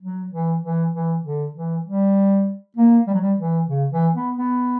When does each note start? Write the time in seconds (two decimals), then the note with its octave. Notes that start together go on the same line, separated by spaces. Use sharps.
0.02 F#3
0.32 E3
0.63 E3
0.93 E3
1.24 D3
1.55 E3
1.85 G3
2.77 A#3
3.07 G3
3.14 F#3
3.21 G3
3.38 E3
3.68 C#3
3.91 E3
4.14 B3
4.37 B3